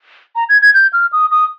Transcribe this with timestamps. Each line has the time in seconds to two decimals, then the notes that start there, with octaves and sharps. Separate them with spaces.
0.36 A#5
0.49 G#6
0.62 G#6
0.74 G6
0.93 F6
1.13 D#6
1.31 D#6